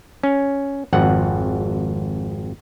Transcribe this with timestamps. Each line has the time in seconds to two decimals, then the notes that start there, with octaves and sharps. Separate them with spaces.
0.23 C#4
0.93 G#1 F2 F#5